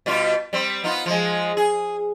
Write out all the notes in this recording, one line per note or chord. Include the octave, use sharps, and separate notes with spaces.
B2 G3 F4
G3 C4
B3 D#4 F4
F3 G#3
G#4